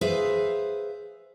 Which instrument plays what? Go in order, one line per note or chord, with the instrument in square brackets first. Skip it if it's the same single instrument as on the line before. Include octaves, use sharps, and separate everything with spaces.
[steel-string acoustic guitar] G#4 B4 C5 E5 F5